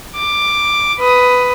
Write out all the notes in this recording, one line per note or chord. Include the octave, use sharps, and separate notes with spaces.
D6
B4 D#6